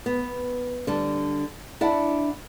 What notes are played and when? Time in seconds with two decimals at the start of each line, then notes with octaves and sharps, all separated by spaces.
0.06 B3
0.87 D3 G3 D4
1.81 D4 E4 D5 F#5